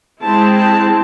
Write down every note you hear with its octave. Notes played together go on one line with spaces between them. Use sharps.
G#3 C4 E4 A5
A5